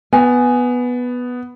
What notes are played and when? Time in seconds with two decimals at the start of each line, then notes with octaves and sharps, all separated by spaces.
0.13 B3 G#5